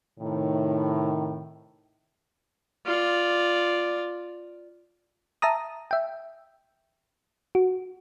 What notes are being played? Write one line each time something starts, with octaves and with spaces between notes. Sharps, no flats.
A2 C3 D#3
F4 D5
E5 A5 A#5 D#6
E5 G5
F#4